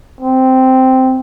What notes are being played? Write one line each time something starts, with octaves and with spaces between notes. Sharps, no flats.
C4